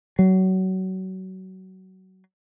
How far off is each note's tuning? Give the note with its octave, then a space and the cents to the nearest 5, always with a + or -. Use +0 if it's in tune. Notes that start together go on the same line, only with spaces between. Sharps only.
F#3 +25